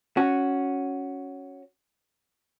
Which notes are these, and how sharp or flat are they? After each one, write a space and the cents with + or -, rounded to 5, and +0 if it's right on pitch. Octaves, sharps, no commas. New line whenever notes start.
C#4 +0 F#4 +0